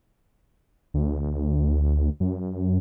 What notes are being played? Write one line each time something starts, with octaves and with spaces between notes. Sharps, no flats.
D2
F#2